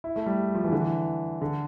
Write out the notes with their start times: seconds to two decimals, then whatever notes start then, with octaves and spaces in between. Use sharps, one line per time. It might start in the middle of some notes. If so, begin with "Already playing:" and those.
0.04 E4
0.16 A3
0.26 G3
0.55 F3
0.64 E3
0.72 D3
0.80 E3
1.42 D3